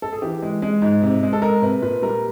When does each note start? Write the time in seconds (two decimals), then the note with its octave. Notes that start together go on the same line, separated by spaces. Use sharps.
0.02 A4
0.12 G#4
0.22 E3 G4
0.42 G#3
0.62 G#3
0.82 G#2
1.03 C3
1.23 G#3
1.33 A4
1.42 G#3 A#4
1.62 C3 B4
1.82 A#2 B4
2.02 G3 A#4